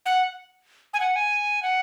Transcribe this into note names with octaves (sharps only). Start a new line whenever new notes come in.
F#5
G#5
F#5
G#5
F#5